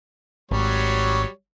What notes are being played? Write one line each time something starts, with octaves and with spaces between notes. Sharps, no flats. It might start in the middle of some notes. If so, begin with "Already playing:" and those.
G#1 F#3 G3 C#5